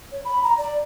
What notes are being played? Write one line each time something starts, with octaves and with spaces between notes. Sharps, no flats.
C#5
B5
A#5
D5